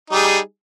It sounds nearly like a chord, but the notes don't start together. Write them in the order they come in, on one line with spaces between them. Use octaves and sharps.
D#4 G3 G#4